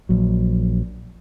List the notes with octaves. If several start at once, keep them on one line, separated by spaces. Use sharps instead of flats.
A#1 F#3